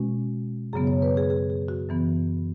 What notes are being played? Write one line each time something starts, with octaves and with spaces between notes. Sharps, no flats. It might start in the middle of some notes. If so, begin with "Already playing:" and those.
Already playing: B2 G#3 C#4 F#4
F#2 C#3 F#3 B3 G#4
C#5
B4
G#4
G#4
G#4
F#4
F#2 E3 B3